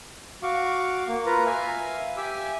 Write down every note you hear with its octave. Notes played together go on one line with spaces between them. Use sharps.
F#4 F5 C#6 D6
A#3
F4 A#4 B4 A#5
E5 F5 G#5
G4 E5 G#5 D6 E6